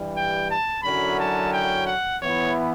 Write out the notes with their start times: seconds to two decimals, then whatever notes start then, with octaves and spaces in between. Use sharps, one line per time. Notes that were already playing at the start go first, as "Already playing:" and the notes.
Already playing: G2 E3 G3
0.15 G5
0.49 A5
0.83 F#2 D3 F#3 C#4 E4 B5
1.18 A5
1.53 G5
1.86 F#5
2.20 E3 B3 E4 C#5